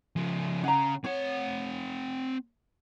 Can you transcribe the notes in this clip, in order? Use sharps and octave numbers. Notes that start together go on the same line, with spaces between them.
C#3 F3
C#3 F#5 A#5
C4 C#5 F#5